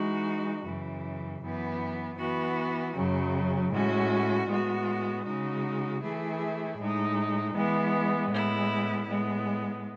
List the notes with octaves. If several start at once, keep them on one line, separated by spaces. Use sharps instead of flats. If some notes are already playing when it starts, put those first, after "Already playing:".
Already playing: E3 G#3 D#4 F#4
F#2 C#3 E3
F#2 E3 B3
E3 B3 F#4
F#2 C#3 F#3
A2 G#3 C#4 F#4
A2 G#3 B3 F#4
C#3 G#3 D#4 F#4
E3 A3 E4 G#4
A2 G#3 D#4
E3 G#3 B3
A2 G#3 B3 E4
A2 G#3 B3